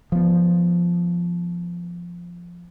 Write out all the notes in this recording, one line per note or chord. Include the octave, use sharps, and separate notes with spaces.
F3 B3